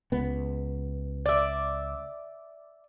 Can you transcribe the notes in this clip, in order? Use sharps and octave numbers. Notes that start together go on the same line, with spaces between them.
C#2 B3
D5 E5